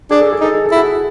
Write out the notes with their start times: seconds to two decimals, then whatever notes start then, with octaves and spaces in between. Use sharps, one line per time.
0.11 D4 G#4
0.21 A4
0.33 G#4
0.41 D#4 A4
0.55 G#4
0.66 A4
0.71 E4
0.76 F#4 G#4